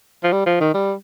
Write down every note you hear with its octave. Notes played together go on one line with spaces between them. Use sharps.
F3
G3
F3
D#3
G3